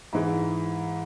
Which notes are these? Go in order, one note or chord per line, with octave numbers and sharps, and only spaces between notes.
G#2 E3 G#3